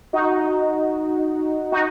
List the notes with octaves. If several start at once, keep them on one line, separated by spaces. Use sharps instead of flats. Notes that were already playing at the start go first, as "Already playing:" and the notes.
D#4 F#4
D#4 F#4